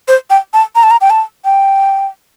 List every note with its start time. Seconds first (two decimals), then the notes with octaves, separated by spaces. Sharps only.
0.08 C5
0.30 G5
0.53 A5
0.75 A#5
0.83 A5
0.91 A#5
1.01 G5
1.10 A5
1.45 G5